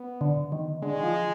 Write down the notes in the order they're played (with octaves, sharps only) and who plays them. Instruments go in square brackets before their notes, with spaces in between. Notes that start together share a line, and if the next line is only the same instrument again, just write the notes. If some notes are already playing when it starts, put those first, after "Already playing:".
Already playing: [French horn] B3
[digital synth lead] D3
D#3
[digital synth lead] D3 [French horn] G#3
[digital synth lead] D#3
F3